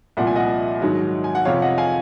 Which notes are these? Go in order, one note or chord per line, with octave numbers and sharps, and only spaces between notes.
C2 A#2 F3 F#5
G#5
D#5 F#5
G#2 D#3 F#3
G#5
F#5
F2 C3 F3 C#5 F5
D#5 F#5
F5 G#5